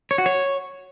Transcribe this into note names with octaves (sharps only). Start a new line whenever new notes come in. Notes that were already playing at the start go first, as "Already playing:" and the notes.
C#5
F#4
C#5